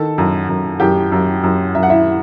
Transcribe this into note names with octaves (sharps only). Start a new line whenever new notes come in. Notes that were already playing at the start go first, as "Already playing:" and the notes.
Already playing: D#3 A4 A5
F#2
F#2
F#2 G4 G5
F#2
F#2
F#2 E5
F#5
E4 E5